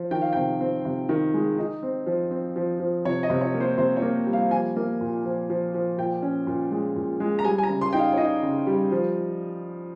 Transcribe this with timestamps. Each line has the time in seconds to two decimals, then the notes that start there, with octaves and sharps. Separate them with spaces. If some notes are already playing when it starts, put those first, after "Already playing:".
Already playing: F3
0.11 D#3 G5
0.22 F5
0.33 C3 G5
0.61 C4
0.85 C3
1.09 D#3
1.34 G#3
1.58 D#4
1.83 C4
2.06 F3
2.31 C4
2.56 F3
2.80 F3
3.05 C3 C#5
3.23 D#5
3.30 C3
3.41 C#5
3.54 A#3
3.60 C5
3.78 C3 C5
3.97 C#5
4.02 A#3
4.27 G3
4.33 F5
4.51 F3 G#5
4.76 A#3
5.01 A#2
5.25 F3
5.50 F3
5.74 F3
5.98 A#2 G5
6.22 C#4
6.47 A#2
6.71 G#3
6.96 A#2
7.20 G#3
7.39 A#5
7.44 G3 G#5
7.58 G#5
7.63 A#5
7.69 C#3
7.81 C6
7.93 D#4 G5
7.99 F5
8.13 C#5
8.18 D#4 D#5
8.43 C#3
8.67 G3
8.91 F3